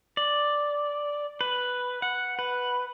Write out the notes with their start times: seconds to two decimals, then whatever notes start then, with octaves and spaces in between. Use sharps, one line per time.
0.17 D5
1.41 B4
2.02 F#5
2.39 B4